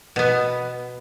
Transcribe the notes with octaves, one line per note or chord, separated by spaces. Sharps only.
B2 B3